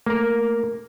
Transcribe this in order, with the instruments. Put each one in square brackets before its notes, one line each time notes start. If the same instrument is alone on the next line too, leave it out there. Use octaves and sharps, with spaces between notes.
[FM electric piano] A3 [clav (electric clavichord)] A#3 A#4